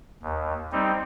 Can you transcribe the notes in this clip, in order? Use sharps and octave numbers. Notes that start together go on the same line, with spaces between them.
D#2
G3 C4 D#4